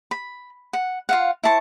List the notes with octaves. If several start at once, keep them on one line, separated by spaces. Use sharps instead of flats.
B5
F#5
F4 F5 F#5
E4 C5 A5 C#6